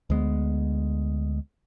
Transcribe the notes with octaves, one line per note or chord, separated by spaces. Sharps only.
D2 G#3 B3